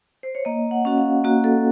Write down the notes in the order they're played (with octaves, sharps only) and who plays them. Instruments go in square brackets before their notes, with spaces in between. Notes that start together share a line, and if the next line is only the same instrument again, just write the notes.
[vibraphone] C5
C#5
A#3 D#5
F#5
C#4 F#4
F5
A#3 F#4
A4